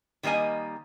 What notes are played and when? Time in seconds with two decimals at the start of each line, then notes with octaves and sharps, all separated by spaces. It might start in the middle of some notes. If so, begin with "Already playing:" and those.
0.23 D#3 G3 A#3 D#5 G#5